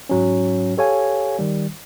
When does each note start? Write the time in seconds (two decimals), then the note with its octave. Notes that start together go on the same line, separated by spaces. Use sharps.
0.09 G#2 F#3 C#4
0.77 G4 A4 C#5 F5 G#5
1.39 D#3 G3